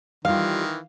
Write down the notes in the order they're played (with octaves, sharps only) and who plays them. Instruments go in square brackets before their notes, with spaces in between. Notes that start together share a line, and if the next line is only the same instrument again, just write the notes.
[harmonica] D#3 E3 [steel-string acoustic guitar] G3 F4 [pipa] F5